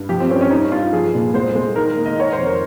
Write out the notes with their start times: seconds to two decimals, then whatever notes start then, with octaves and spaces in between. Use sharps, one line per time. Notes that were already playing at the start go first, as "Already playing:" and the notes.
Already playing: G2
0.09 F3 G4
0.20 C4
0.30 G2 C#4
0.41 C#4
0.50 G3 D#4
0.72 G2 F4
0.93 F3 G#4
1.14 A#2
1.34 G#3 C5
1.55 G#3
1.76 D#3 A#4
1.97 A#3
2.06 D#5
2.18 D#3 C#5
2.33 C5
2.38 F2
2.46 A#4